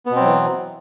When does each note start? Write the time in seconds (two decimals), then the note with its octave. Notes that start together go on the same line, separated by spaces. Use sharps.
0.06 B3
0.11 B2
0.16 C4
0.21 F#3
0.26 E3